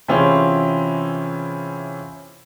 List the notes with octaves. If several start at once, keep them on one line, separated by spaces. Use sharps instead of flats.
C3 E3 C4 C#4 F4 G#4